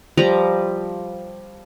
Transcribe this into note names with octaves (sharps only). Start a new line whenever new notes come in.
F3 G3 A#5